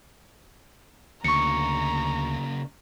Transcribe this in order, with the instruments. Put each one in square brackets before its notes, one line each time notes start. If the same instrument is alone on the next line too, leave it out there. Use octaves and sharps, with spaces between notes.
[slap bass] D2 [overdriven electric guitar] C#3 A#3 [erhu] A#5 [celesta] C#6 C#7